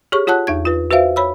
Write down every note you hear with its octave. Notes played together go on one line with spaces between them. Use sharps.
G4 G#4 C#5 C#6
F4 C#5 F#5 A5 F#6
E2 D#4 G#6
F4 B4
F#4 B4 C5 E5 F5
C#5 B5 E6